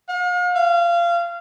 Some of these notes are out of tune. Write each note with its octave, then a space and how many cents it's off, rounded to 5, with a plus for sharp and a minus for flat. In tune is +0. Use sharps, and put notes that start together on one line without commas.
F5 +40
F5 -25